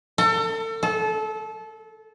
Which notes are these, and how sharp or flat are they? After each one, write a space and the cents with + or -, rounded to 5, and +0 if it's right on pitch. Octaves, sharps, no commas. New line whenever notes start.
A4 +35
A4 -25